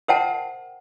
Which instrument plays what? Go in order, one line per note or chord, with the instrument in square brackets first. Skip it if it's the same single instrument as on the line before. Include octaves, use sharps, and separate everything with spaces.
[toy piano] A#4 C5 E5 F#5 G5 A5